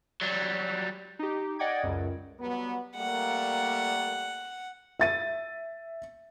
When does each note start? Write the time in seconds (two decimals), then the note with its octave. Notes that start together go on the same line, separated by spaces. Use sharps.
0.21 F#3 G3
1.19 D#4 G4
1.59 D5 D#5 F#5 G5 D6 G#6
1.83 C#2 F#2
2.39 F#3 G3 B3
2.96 G3 A3 A#3 F#5
4.99 E5 A6 D#7